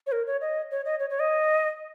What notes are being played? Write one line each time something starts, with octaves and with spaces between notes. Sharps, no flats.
C#5
A#4
C#5
D#5
C#5
D#5
C#5
C#5
D#5